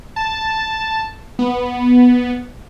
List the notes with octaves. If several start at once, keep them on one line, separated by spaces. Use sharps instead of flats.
A5
B3